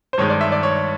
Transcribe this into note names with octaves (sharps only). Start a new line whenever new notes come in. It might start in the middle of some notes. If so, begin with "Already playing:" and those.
C5
G2 D#3 G#3 C#5
D5
E5
D5
C#5